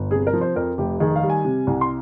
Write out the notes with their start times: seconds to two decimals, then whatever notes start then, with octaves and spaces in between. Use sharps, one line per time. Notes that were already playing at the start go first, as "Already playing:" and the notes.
Already playing: G1
0.11 C3 G#4
0.27 A#4
0.33 F3
0.41 C5
0.56 F2 A#4
0.78 F1 G4
1.00 D#3 G#4
1.16 F5
1.23 G3
1.30 G#5
1.45 C3
1.67 C2
1.81 C6